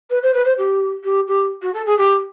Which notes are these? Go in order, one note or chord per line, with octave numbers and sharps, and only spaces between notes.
B4
C5
B4
C5
G4
G4
G4
F#4
A4
G#4
G4